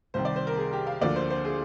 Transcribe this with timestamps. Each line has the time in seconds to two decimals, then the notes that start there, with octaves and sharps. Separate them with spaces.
0.14 C2 C3 D#3 G3 C5
0.25 D5
0.36 C5
0.47 A#4
0.57 G#4
0.73 G4
0.87 F5
1.01 D2 D3 F3 A#3 D5
1.16 C5
1.30 C5
1.45 G#4